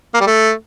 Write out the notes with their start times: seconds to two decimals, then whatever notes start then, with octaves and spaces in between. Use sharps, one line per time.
0.14 A#3
0.20 G3
0.27 A3